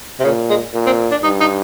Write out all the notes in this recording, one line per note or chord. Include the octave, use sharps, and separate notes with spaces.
C3
A#2 C#3
G#3
A#2
C4
D4
G2 D#4
D#4